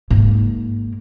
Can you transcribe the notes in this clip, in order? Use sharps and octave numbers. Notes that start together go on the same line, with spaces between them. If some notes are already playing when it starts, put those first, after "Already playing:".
G#2 A#3